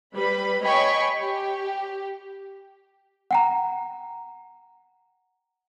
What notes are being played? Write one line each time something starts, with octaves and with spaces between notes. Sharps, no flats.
G3 B4 B5
C#5 D#5 G5 G#5 B5 C#6
G4
F#5 G5 A#5